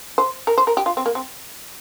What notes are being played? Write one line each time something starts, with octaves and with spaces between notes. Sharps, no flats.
C5
A#4
C5
A#4
G4
F4
C4
A#3
C4